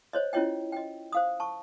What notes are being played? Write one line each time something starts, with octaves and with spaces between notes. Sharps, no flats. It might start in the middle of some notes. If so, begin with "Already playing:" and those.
C5 C#5 D#5
C#4 E4 F4 C#5 D#5 G5
D#5 G5
C5 F5 D#6
A5 C#6